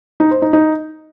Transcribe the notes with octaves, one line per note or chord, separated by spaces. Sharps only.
D#4
C5
D#4
D#4